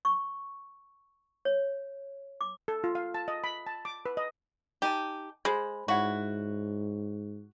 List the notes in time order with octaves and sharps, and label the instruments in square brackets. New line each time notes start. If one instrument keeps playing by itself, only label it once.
[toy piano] C#6
C#5
D6
[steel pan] A4
F4
F5
A5
D#5
B5
A5
D6
B4
D#5
[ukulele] D#4 G#5 A5 [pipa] G4
[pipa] G#3 [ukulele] C5 B5
[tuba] G#2 [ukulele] E4 C#5 F#5 [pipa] F#4